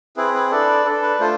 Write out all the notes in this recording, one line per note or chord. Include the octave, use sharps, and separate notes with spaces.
C4 E4 G#4 B4
B4
D4 A4 B4 D5
D4 A4
B4
A3 D4 F4 A4 C5